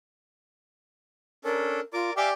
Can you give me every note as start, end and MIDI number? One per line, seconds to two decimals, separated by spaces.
1.44 1.80 61
1.44 1.80 62
1.44 1.80 69
1.44 1.80 70
1.93 2.11 65
1.93 2.13 70
1.93 2.13 74
1.93 2.13 86
2.17 2.34 67
2.17 2.34 74
2.17 2.29 76
2.17 2.29 77
2.17 2.29 80